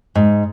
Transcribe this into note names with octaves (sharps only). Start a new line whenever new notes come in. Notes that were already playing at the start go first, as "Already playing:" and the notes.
G#2